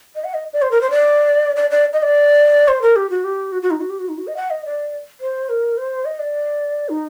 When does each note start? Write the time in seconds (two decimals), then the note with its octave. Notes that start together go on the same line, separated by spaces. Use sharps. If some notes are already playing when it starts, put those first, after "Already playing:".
0.15 D#5
0.24 F#5
0.34 D#5
0.53 D5
0.62 C5
0.71 A#4
0.81 C5
0.90 D5
1.56 D5
1.70 D5
1.93 D#5
2.02 D5
2.68 C5
2.82 A#4
2.96 G4
3.10 F#4
3.24 G4
3.52 F#4
3.62 F#4
3.71 D#4
3.81 F#4
3.90 G4
3.99 F#4
4.09 D#4
4.18 F#4
4.27 D#5
4.37 F#5
4.50 D#5
4.65 D5
5.21 C5
5.49 A#4
5.78 C5
6.05 D#5
6.19 D5
6.89 D#4